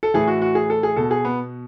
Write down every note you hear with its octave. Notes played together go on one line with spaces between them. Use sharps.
A4
A2 E3 G#4
F#4
F#4
G#4
A4
G#4
B2 A4
G#4
B3